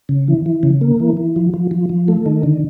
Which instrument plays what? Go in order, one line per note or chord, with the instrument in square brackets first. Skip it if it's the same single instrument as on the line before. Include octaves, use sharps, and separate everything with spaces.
[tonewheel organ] C#3
E3
E3
C#3
A#3
E3
E3
F3
F3
F3
F3
A3
D#3
D3